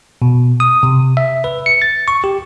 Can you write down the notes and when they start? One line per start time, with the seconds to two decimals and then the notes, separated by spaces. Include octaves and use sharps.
0.22 B2
0.60 D#6
0.83 C3
1.17 E5
1.44 B4
1.66 C#7
1.82 A6
2.08 C#6
2.24 G4